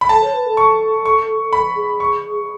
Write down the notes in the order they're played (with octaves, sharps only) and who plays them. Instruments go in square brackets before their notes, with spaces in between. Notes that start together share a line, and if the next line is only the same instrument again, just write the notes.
[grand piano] B5
[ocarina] A4 [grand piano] A5
[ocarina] C#5
B4
A4
[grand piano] C#6
C#6
B5
[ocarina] G#4
[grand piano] C#6